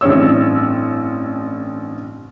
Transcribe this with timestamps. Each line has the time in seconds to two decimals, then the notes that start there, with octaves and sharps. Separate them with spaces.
0.01 A1 G2 C4 C#5 E6